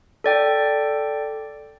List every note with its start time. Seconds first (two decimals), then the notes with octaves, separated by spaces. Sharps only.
0.24 A4 D5 G5